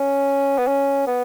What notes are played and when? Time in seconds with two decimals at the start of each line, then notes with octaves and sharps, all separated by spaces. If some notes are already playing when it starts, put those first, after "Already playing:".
Already playing: C#4
0.58 B3
0.67 C#4
1.07 B3